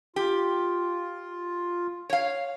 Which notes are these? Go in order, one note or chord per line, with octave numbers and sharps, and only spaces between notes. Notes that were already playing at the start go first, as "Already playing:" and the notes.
F4 G4
C#5 F5